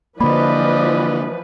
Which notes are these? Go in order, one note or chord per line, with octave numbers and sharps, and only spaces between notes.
D3 E3 F3 A#3 B4 D5 D#5 B5